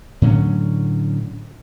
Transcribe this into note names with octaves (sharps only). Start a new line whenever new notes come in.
A2 D3 F#3 C#4